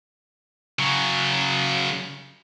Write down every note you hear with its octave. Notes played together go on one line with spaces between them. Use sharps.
C#3 F#3